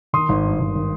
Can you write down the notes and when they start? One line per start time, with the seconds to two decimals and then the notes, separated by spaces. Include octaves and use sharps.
0.13 D#3 C6 D#6
0.29 G#1
0.45 G2
0.60 G#1
0.76 D#3